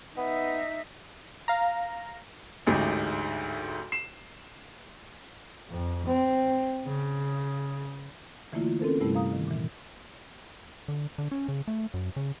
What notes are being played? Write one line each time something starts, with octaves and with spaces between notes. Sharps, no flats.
B3 D#4 E5
F5 A#5
A1 D2 G#2
C7 E7
F2
C4
C#3
D3 E3 A3 A#3 E4 F4
C4 C#4 A4 A#4 C5
G2 C3 G3 A3 E4
F5 A#5 D#6
D#3
A#2 E3
D3
D3
C#4
C#3
A3
F#2
C#3